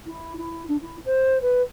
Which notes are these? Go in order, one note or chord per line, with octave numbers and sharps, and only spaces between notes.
E4
E4
D4
E4
C5
B4